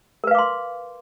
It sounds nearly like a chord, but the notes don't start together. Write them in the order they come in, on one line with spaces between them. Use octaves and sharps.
A#4 B4 F5 D6 C6